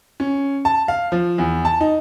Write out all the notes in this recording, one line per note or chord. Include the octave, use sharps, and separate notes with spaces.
C#4
A5
F5
F3
E2
A5
D#4